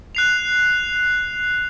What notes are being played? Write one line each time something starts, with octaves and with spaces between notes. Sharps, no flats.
F#6 C7 F7